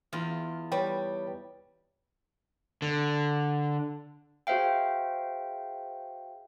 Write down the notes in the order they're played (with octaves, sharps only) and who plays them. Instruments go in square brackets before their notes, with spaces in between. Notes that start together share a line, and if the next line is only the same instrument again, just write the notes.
[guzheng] E2 F4
[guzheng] G3 [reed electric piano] B4 C#5 G5
[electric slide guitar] D3
[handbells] F#4 G#4 C5 E5 F5 G5